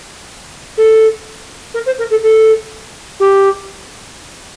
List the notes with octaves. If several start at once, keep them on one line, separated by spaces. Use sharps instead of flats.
A4
A#4
C5
A#4
A4
A4
G4